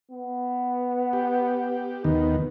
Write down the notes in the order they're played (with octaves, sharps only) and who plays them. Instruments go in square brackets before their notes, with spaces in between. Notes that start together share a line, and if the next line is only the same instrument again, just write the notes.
[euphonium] B3
[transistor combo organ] G4
D#2 D#3 B3